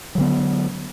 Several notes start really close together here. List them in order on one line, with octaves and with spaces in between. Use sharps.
F#3 D3 B3